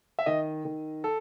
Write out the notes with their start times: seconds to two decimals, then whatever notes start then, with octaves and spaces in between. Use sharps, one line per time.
0.19 E5
0.26 D#3 D#5
0.65 D#3
1.04 A4